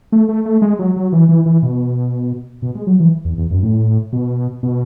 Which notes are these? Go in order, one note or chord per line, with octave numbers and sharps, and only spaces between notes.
A3
A3
A3
G#3
F#3
F#3
E3
E3
E3
B2
B2
G#3
F#3
E3
E2
E2
F#2
A2
B2
B2